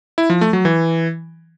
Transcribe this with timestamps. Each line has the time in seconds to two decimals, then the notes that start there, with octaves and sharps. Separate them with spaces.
0.18 E4
0.30 F3
0.41 A3
0.53 F#3
0.65 E3